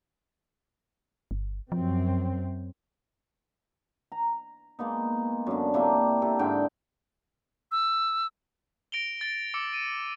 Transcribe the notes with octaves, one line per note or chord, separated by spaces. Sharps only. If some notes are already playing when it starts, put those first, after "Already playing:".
G1
F#2 F3 C4
A#5
G#3 A#3 B3 D#4
F#2 D3
C3 A#3 D4 E4
C3 A4
G#2 D3 G5
E6
A#6 D7 F7 G7
A6 G7
D6 E6 C#7
D#7